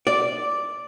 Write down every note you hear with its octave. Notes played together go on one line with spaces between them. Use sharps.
D5